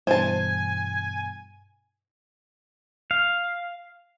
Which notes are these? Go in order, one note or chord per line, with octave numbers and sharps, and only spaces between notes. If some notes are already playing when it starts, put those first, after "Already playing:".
G2 B2 E3 C5 G#5 A5
F5